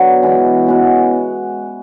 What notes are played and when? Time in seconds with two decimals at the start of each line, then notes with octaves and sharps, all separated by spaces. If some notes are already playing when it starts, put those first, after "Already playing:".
Already playing: B2 D3 F#3 B3 D4 F#4
0.23 E3 G#3 B3 E4
0.66 C#3 G#3 B3 F#4